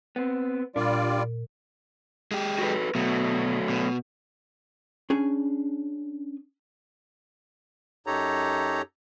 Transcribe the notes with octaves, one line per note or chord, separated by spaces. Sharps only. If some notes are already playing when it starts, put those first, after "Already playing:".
B3 C4
A#2 G3 D4 F4 D5
G#3 G4
F#4 A4 B4
B2 F#3 A3
B2
C#4 D4 G#4 G#5
F#2 D#4 G4 A4 C#5 A#5